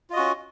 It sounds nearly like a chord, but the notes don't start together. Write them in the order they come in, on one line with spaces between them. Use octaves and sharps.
F4 D#5 F#4 C#4